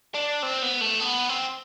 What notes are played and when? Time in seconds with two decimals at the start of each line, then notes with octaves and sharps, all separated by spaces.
0.14 D4
0.43 C4
0.62 B3
0.81 A3
1.00 B3
1.29 C4